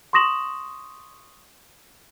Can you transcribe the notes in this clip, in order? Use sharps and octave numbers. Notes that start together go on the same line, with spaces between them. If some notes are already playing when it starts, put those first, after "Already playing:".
C6 C#6 D#6 A#6 E7 F#7